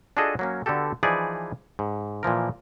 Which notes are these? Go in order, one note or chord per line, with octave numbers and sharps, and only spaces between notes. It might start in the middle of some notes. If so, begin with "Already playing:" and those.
D4 F4 F#4 G#4 A4 D#5
F#3 A#3 C#4
D3 B3 F#4 G4 A4
E3 F3 D#4 G#4 B4 D5
G#2
A#2 E3 F3 A#4